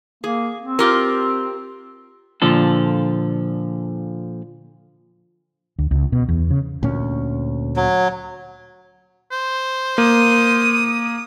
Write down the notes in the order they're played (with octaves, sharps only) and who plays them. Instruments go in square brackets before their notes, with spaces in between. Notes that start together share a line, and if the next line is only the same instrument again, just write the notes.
[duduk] A#3 [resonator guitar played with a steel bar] G#4
[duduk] C4
[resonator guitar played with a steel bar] F4 G4 A#4
[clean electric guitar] A#2 D3 F3 A4
[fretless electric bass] D2
C#2
B2
E2
C#3
D2 A#2 C#4
[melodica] F#3
[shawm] C5
[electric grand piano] A#3 [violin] D#6